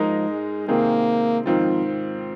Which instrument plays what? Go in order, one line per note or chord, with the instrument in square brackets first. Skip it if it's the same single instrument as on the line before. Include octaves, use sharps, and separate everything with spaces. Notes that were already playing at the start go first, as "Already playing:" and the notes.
Already playing: [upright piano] G#2 G#3 D#4 A#4 [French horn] F3
[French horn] G#3
[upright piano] C3 D#3 C4 G#4 [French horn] A#3
[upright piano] G#2 D#3 C4 F4 [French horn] F3
[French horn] C4